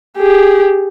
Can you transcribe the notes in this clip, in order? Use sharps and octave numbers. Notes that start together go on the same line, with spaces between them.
G4 G#4